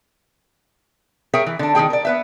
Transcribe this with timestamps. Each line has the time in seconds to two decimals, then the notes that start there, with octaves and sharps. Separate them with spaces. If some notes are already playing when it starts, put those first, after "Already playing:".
1.34 G#4 A#4 C#5 E5 G5
1.46 E3
1.59 D3 D4
1.75 D#3 C4 G#4 G5
1.90 A#4 D5
2.05 B3 B4 E5